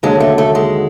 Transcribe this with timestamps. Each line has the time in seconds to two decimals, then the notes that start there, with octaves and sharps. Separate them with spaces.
0.03 D#2 D3 F#3 G#3
0.20 A3
0.38 A3
0.55 G#3